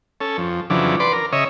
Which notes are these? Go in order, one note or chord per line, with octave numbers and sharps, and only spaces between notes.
C#4 A4
F2
F2 C#3 E3 F#3 D4
B4 D5 C6 D6
A#4
C#3 C#5 D#5 E5